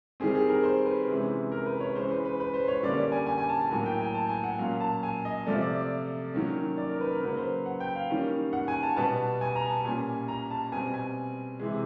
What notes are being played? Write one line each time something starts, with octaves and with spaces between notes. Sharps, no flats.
D#3 G3 C4 G#4
G#4
A#4
C5
B4
C3 E3 G#3 C#4
A#4
B4
C#5
E3 G#3 C#4 C5
B4
B4
B4
C5
C#5
D3 G3 A#3 C#4 D5
D5
G#5
G#5
G#5
A5
A5
A2 F#3 A#3 G#5
G5
G#5
A5
G#5
F#5
A#2 F#3 A#3 C#4 F5
A5
G#5
D#5
C3 F3 A3 D5
D5
D5
D#3 F#3 A#3 C#4
D5
A#4
B4
A#4
C#3 F#3 A#3 B4
C5
F#5
G5
F5
D#3 G3 A#3 C#4
F#5
G#5
A5
B2 G3 B3 A5
G#5
A#5
A5
A#2 G3 A#3 C#4 G#5
A#5
A5
B2 G3 C4 G#5
G#5
C3 E3 G#3